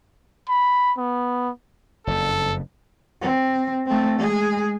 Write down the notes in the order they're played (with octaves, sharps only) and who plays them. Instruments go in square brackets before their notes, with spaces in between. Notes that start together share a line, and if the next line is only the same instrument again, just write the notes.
[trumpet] B5
B3
[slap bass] F#1 F2 [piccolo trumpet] A4
[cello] C4
A3 C4
G#3 G#4